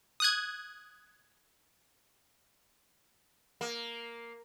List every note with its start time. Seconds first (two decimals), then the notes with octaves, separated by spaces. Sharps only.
0.20 D#6 F#6 G#6
3.61 A#3